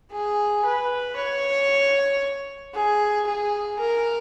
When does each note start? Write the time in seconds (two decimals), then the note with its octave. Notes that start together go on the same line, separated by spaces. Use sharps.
0.11 G#4
0.65 B4
1.16 C#5
2.74 G#4
3.27 G#4
3.79 A#4